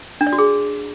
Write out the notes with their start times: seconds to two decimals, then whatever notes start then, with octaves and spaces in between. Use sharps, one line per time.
0.21 D4
0.27 D5
0.33 F#4
0.38 G#4